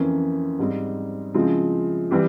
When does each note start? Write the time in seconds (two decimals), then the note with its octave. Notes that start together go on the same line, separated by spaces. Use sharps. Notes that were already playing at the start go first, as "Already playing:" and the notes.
Already playing: F2 E3 A#3 C#4
0.59 G#2 G3 C4
1.34 C#3 F3 G#3 C4 E4
2.11 E3 G3 C4 G4